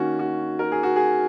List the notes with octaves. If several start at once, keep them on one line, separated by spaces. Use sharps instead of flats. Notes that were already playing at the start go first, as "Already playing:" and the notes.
Already playing: D#3 A#3 C#4 F#4
F#4
A#4
G#4
F#4
G#4